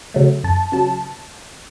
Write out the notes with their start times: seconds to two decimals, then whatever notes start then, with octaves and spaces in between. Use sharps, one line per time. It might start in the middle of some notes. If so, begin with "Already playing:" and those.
0.14 C#3 F#3 A3
0.43 F#2 A5
0.72 C#3 F#3 A5